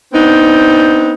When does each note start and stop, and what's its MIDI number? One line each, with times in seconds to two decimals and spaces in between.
0.13 1.14 59
0.13 1.14 60
0.13 1.14 62
0.13 1.14 63